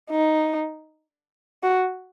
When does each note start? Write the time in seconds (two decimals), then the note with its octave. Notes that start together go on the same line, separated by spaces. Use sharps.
0.10 D#4
1.63 F#4